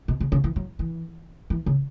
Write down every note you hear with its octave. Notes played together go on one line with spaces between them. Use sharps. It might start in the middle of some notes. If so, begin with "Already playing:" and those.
B2
C#3
C#3
E3
F#3
E3
E3
C#3